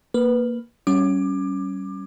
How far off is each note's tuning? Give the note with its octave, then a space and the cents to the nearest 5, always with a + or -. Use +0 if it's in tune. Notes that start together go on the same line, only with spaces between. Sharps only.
A#3 +0 B4 +0
G3 -30 C#4 +0 D6 +25